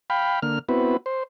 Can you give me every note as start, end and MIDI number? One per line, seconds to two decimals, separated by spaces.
0.10 0.40 77
0.10 0.40 79
0.10 0.40 83
0.42 0.59 50
0.42 0.59 58
0.42 0.59 89
0.69 0.97 59
0.69 0.97 60
0.69 0.97 64
0.69 0.97 66
0.69 0.97 71
1.06 1.23 72